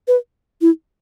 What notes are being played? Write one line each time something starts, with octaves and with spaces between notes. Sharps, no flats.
B4
E4